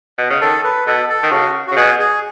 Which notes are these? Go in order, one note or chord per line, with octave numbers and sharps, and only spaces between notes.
B2
C#3
D#3 A4
B4
B2 A4
A4
D#3
C#3 F#4
C#3 F#4
B2 G#4
G#4